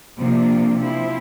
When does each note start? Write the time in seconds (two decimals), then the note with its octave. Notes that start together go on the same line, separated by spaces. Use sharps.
0.17 C3 F3 A#3 D4
0.80 F3 C4 E4